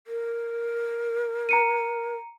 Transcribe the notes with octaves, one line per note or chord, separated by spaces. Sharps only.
A#4
A#5 C#7 D#7